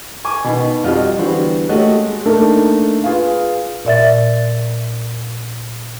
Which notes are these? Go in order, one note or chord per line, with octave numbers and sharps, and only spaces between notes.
G#5 C#6 D6
B2 D#3
F2 G3 F4 F#4 D#5 F6
D3 E3 G3 B3 F#4 C5
A3 A#3 F#4 G4 C#5 D#5
G#3
A3 A#3 D4 D#4 A4 A#4
F4 G#4 B4 F5
A#2 D5 E5 A6